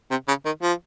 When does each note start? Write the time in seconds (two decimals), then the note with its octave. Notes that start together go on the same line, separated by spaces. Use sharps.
0.11 C3
0.28 C#3
0.45 D#3
0.62 F3